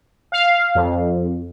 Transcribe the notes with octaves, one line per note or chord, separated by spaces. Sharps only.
F5
F2